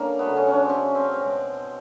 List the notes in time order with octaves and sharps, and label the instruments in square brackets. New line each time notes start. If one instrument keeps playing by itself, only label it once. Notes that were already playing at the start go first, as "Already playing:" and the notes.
Already playing: [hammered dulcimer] D3 G3 A#3 C#4
C#3 F#3 A3 B3
C#4
C#4
D4
C4 C#4
C4
C#4
C4
B2 G#3